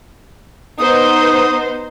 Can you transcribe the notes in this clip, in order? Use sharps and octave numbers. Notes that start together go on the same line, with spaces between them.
B3 D#4 C5 D#6